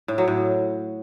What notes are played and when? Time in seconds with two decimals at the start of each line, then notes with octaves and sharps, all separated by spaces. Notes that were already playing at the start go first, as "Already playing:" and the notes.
0.08 A2
0.18 F#3
0.28 A2